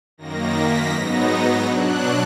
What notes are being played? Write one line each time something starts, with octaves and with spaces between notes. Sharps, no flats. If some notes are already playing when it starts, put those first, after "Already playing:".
F#2 D#3 A#3 A#6
B6
G#2 F#3 B3 D#4 A#6
B2 F#3 D4 F#6